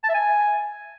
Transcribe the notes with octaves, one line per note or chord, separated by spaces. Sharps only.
A5
E5
G#5